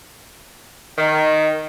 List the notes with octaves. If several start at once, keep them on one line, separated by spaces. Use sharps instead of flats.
D#3